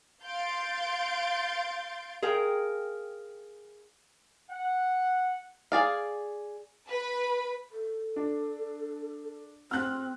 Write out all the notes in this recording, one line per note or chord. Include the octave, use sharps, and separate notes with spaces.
F5 C6 G6 A6 D7
G#4 A#4 F5 G5
F#5
G#4 D5 F5
B4 B5
A4
D4
C4 F6 F#6